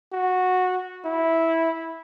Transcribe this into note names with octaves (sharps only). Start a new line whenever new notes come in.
F#4
E4